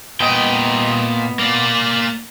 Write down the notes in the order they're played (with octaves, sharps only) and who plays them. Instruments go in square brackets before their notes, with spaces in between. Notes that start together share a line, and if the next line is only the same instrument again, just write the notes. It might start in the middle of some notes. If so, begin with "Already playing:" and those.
[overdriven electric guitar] A#2 G5 [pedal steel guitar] B3 D#5
[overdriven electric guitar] A#3 D5